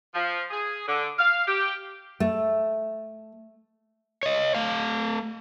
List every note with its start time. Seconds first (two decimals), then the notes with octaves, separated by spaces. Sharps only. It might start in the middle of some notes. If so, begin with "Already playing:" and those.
0.14 F3
0.51 G#4
0.86 D3
1.18 F5
1.47 G4
2.20 A3
4.23 C#5 D#5
4.55 A3 F5